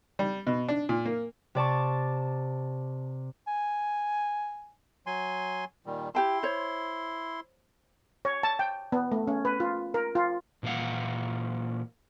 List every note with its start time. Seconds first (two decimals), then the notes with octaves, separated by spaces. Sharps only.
0.19 G3
0.47 B2
0.68 D4
0.89 A#2
1.05 A#3
1.55 C3 D5 A5 C#6
3.48 G#5
5.06 F#3 G#5 C6
5.86 A#2 D#3 G3
6.15 E4 G4 G5 A5 C6
6.43 C5 C#5
8.25 C#5
8.43 A5
8.59 G5
8.92 B3
9.12 A3
9.27 C#4
9.45 B4
9.60 F4
9.94 A#4
10.15 F4
10.63 A#2 E3 A#3 F5 F#5